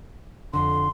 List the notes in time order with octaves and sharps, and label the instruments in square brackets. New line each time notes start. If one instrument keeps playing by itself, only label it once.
[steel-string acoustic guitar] F2 D3 [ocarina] C6